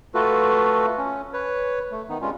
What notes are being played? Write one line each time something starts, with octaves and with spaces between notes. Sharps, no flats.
A3 F4 F#4 A4 B4
C#4
B4 C#5
A3
D#3 B3 D#4
G2 G3 G#3 C#4 F4